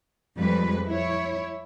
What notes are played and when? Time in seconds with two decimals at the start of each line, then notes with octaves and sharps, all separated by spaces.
0.38 F2 G3 G#3 B4
0.89 E4 C#5